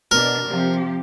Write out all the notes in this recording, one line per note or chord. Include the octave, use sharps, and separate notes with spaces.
B2 D4 A#4
C3 F3 G4